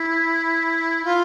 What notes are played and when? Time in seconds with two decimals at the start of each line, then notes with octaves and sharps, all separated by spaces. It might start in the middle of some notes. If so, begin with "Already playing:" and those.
Already playing: E4
1.05 F4